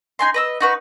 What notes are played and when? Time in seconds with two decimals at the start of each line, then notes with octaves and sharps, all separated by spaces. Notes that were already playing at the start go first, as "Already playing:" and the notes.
0.19 D#4 G#5 C6
0.34 B4 D#5 E6
0.60 D#4 F#4 B4